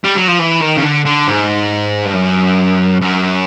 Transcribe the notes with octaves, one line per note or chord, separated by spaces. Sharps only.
G3
F#3
F3
E3
D#3
C#3
D3
D3
G#2
G2
F#2
F#2